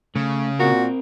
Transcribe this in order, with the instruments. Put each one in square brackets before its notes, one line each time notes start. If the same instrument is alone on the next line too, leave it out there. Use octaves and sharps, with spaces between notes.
[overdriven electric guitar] C#3 [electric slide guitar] A3
[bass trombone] A#2 [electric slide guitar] C4 A#4 [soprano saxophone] F#4